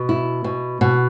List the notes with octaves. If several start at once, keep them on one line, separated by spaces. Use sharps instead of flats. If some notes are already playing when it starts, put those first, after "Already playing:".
Already playing: B2
E4
B2
B2